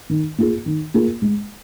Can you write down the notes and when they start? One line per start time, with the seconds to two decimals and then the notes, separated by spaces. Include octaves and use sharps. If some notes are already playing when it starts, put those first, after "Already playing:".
0.09 D#3
0.38 A#3 F4 G#4
0.66 D#3
0.94 A#3 F4 G#4
1.22 G#3